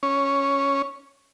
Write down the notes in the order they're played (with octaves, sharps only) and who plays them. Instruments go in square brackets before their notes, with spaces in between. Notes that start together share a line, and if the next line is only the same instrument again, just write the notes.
[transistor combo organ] C#4